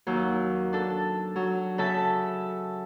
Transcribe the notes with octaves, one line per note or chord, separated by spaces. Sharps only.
D#2 F#3
D4 A4
F#3
C#3 A4 E5 A5